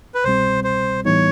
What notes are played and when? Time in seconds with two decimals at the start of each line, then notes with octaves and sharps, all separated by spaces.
0.15 B4
0.24 C2 B2 G3 C4 C5
0.64 C5
1.05 A2 E3 G3 B3 D#4 C#5